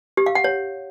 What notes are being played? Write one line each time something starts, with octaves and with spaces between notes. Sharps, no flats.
G4
F5
F#5
C#5